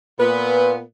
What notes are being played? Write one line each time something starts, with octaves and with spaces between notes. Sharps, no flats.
A#2 B3 B4